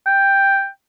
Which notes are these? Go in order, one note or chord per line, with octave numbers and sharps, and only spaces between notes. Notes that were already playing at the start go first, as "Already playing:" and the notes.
G5